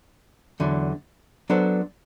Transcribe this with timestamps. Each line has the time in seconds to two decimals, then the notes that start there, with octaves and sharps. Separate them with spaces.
0.60 E2 D3 F#3
1.50 F#3 B3 D4 A4 C5